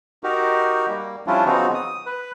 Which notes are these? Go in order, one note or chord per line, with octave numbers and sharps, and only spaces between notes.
D#4 F#4 G4 A#4
G3 A#3
F3 G3 C#4 D4 E4 F4
C#3 F3 B3 C4 D#4 F#4
D#6
B4